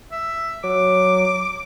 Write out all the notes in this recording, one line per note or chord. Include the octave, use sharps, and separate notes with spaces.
E5
F#3 D6